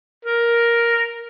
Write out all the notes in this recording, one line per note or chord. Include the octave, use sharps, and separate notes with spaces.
A#4